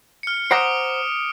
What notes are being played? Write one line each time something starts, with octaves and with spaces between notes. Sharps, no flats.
F6 C#7
C5 F#5 A#5 D6 D#6 D7